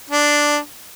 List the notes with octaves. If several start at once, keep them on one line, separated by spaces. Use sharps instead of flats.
D4